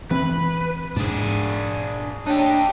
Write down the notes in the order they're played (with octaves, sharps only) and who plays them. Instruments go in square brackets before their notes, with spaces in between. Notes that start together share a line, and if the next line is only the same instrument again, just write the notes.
[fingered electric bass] E3 C4 [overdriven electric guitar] B4
[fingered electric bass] G#2 [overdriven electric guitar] D4 G#4
[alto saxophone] D4 [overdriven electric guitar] D#4 G4 [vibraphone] C#5 G5